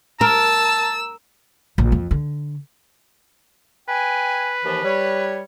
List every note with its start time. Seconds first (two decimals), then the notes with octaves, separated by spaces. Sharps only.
0.21 A#4 A5 E6
1.78 A#1
1.92 F2
2.11 D3
3.89 B4 G5 G#5
4.64 D#2 E3 F3
4.84 G3 C#5